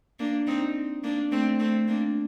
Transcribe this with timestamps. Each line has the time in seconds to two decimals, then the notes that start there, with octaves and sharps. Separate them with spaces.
0.19 A#3 D4
0.47 C4 D#4
1.03 A#3 D4
1.32 A3 C4
1.60 A3 C4
1.88 A#3 D4